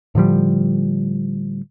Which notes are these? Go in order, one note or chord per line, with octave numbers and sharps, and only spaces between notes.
A2 D3 F3 G3